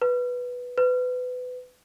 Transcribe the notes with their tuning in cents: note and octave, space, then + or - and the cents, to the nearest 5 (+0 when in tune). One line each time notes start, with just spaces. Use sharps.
B4 -5
B4 +25